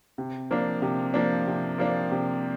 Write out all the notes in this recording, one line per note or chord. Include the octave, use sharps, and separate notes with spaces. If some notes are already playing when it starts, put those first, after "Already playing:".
C3
F3 A#3 D4
C3
F3 A#3 D4
C3
F3 A#3 D4
C3